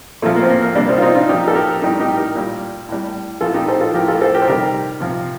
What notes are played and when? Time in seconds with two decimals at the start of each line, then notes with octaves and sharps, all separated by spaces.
0.22 A#2 F3 A3
0.36 A#3
0.42 C4
0.49 A#3
0.62 A#3
0.75 C3 G3 A#3 D4
0.89 C4 D#4
0.98 F4
1.02 C4 D#4
1.15 D4 F4
1.29 A#2 F3 D#4 G4
1.47 A4
1.55 G4 A#4
1.82 A2 G3 D#4 G4
2.00 D#4 G4
2.17 G4 A#4
2.35 A#2 G3
2.88 A2 G3
3.41 A2 F3 F4 A4
3.54 D#4 G4
3.68 A4 C5
3.81 F4 A4
3.94 A2 F3 G4 A#4
4.08 F4 A4
4.21 A4 C5
4.34 G4 A#4
4.42 C5
4.47 C3 D#3 G3 G4 A#4
5.00 C3 F3